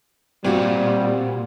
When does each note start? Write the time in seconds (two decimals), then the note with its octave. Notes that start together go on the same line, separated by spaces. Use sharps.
0.44 A#2 G3 C4 F4 F#4